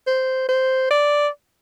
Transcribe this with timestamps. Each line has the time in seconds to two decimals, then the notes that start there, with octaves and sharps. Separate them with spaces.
0.07 C5
0.49 C5
0.91 D5